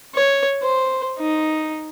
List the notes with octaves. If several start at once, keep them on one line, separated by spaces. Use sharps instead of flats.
C#5
C5
D#4